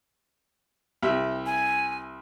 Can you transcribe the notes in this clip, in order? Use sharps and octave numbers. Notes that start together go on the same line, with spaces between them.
C2 G4 E5
G#5